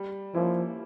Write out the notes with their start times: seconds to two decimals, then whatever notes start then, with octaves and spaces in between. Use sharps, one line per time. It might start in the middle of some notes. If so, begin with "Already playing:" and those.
Already playing: G3
0.35 F3 A#3 C#4 E4